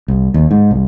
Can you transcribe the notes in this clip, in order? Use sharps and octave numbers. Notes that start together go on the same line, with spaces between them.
C2
D#2
G#2
C2